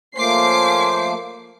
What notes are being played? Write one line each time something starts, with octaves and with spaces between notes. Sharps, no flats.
F3 A3 A#3 C#4 C5 D6 C7